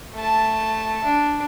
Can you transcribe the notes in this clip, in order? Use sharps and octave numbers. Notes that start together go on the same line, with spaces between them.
A3 A5
D4